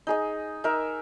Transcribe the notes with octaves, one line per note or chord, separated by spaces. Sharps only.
D#4 G#4 D#5
D#4 A#4 E5